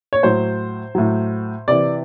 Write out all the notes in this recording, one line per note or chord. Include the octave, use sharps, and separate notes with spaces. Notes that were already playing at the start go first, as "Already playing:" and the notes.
C#5
A2 F#3 C5
A2 F#3
C3 E3 D5